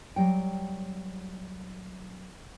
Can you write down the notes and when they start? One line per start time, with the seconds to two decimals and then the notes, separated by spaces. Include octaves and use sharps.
0.16 F#3 G3 G5